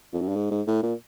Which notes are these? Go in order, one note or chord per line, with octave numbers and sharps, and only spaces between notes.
F2
F#2
G2
G#2
G#2
A2
A#2